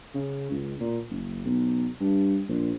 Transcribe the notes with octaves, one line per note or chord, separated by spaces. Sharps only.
C#3
C#2
A#2
F#1
B1
G2
A#1